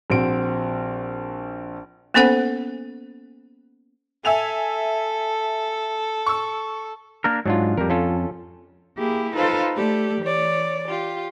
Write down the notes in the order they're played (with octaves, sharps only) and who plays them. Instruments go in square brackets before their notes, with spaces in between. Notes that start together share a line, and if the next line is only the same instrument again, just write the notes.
[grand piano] A#1 C4 F#4 D7
[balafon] A#3 B3 C#4 A4 C5 F#5
[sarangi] A4 [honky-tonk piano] E5 G#5 F7
[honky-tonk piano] C#6 E6
[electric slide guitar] A#3 D4 A#4
[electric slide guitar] G#2 [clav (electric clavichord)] F#3 D4 F4
[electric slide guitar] F2 [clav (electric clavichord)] G3 A#4
[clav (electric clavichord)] C#4 F4 A4
[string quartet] A#3 E4 G4 G#4
D#4 F4 A4 B4 C5 F5
A3 G4 A4 D5
E3 C#5 D5
F4 G4